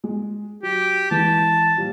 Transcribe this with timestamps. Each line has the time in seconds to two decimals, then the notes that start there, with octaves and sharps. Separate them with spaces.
0.04 G#3
0.63 F#3 G4
1.11 E3 G#3 A5
1.77 A#2 F3 G3